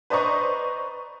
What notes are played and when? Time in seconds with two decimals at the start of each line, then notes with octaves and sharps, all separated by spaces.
0.10 B4 C5 D5 D#5 A#5 C#6